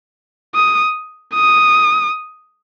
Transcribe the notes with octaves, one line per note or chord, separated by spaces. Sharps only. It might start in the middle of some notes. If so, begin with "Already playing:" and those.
D#6
D#6